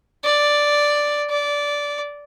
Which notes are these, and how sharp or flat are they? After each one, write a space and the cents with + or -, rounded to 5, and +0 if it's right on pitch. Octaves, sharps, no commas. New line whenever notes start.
D5 +0
D5 -15